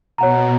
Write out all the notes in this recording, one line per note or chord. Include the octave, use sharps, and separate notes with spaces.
B2 C#5 F#5 A#5